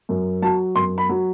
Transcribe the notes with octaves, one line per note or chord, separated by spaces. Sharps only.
F#2
F#3 A5
F#2 C6
B5
F#3